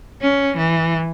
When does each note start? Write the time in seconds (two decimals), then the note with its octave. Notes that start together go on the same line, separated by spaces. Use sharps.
0.21 C#4
0.57 E3